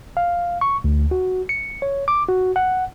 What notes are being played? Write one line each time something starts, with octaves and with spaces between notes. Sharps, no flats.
F5
C#6
D2
F#4
C#7
C#5
D6
F#4
F#5